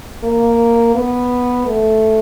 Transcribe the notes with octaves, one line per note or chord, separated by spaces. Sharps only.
A#3
B3
A3